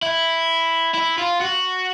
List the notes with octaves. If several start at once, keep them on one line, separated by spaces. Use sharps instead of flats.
E4
E4
F4
F#4